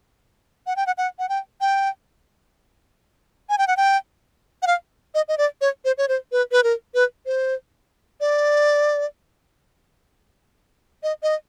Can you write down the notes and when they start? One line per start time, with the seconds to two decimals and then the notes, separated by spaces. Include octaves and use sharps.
0.67 F#5
0.76 G5
0.87 F#5
0.98 F#5
1.19 F#5
1.29 G5
1.61 G5
3.49 G#5
3.58 G5
3.67 F#5
3.77 G5
4.62 F#5
4.67 F5
5.15 D#5
5.28 D#5
5.38 D5
5.61 C#5
5.85 C5
5.98 C#5
6.08 C5
6.32 B4
6.52 B4
6.63 A#4
6.94 B4
7.26 C5
8.21 D5
11.03 D#5
11.23 D#5